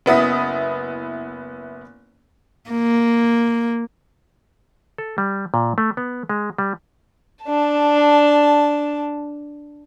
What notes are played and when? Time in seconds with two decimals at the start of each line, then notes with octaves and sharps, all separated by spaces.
0.06 F#1 B3 E4 D#6 B6
2.71 A#3
4.98 A4
5.18 G3
5.54 A#2
5.78 A3
5.97 B3
6.29 G#3
6.58 G3
7.44 D4 A5